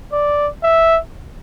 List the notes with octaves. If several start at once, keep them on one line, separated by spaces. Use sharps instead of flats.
D5
E5